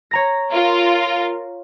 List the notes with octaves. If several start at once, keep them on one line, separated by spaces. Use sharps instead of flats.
C#5 A#5 A#6
F4 A#4